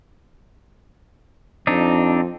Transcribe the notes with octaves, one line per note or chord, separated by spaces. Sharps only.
F2 C4 D4 D#4